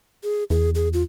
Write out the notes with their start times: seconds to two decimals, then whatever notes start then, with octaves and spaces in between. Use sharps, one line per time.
0.23 G#4
0.50 E2 G#4
0.75 G#4
0.93 F4